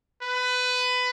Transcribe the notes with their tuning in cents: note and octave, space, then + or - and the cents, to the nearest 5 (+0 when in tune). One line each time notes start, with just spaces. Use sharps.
B4 +20